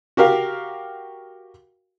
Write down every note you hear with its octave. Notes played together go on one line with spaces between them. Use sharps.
F#4 G4 A#4 F5